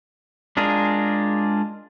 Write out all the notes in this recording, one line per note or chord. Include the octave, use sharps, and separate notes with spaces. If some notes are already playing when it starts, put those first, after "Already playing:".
G#3 D4 F4 G#4 A#4